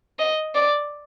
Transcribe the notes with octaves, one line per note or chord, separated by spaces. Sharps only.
D#5
D5